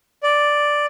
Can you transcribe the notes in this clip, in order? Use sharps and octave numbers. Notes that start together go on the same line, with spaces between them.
D5